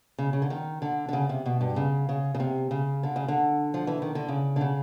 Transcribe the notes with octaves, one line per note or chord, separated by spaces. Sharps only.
C#3
C#3
D3
D#3
D3
D3
C#3
C3
B2
G2
C#3
C#3
C#3
C3
C#3
D3
C#3
D3
F3
E3
D#3
D3
C#3
D3
C#3